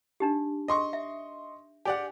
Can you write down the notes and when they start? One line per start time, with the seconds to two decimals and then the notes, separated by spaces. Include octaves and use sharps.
0.20 D4 D#4 G4
0.68 D#5 C6 C#6
0.93 E5
1.85 G4 D5 F#5 G#5